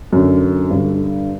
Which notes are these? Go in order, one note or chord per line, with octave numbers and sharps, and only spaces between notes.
F#2 D3
G2 D3